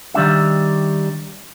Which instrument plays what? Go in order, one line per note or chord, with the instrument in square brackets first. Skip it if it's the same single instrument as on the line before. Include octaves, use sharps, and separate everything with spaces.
[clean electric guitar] D#3 G3 D4 E5